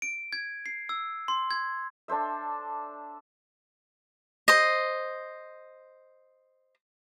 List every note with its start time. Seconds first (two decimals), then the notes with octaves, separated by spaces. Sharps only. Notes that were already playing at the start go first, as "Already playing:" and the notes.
0.02 D7
0.33 G#6
0.66 C7
0.89 E6
1.28 C6
1.51 G#6
2.08 D4 A4 C5 E5
4.48 C5 D#5